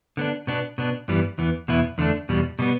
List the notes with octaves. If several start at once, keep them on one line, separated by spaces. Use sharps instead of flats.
D3 B3 D4
B2 B3 D4
B2 B3 D4
G2 E3 G3 B3
E2 E3 B3
E2 B2 B3 E4
E2 D3 A3 D4
E2 B2 G3
B2 G3 B3